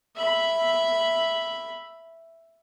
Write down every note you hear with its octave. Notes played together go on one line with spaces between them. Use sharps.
E5 B5